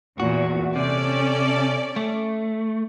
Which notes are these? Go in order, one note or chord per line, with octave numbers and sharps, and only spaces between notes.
E2 A#2 F#4
C3 C#4 A4 D5
A3